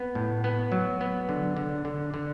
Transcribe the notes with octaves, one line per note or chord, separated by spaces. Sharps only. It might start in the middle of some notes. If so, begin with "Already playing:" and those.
Already playing: B3
A2
B3
F#3
B3
D3
D3
D3
D3